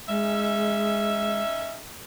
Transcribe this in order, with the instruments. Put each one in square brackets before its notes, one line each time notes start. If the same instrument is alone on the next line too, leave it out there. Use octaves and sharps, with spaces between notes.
[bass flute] G#3 [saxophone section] C#4 D#4 E5